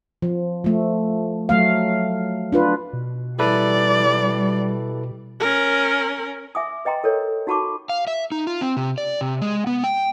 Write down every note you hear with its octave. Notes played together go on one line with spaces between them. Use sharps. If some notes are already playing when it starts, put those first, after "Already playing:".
F3
F3 A3
F#3 A3 F5
D4 F4 B4
B2
G3 E4 A4 B4 D5
C#4 A#4
E5 G#5 D6 D#6
B4 D#5 G5 A#5 C6
A4 A#4 C#5
D#4 F#4 A5 B5 C#6 D6
F5
E5
D#4
F4
C4
C3
D5
C3
G#3
B3
G5